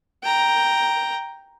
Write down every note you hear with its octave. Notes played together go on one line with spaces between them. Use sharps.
G5 A#5